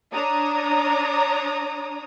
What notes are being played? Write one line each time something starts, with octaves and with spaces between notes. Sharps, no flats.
D4 C#5 A#5 D#6